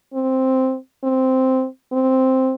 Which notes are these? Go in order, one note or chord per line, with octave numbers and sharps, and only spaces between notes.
C4
C4
C4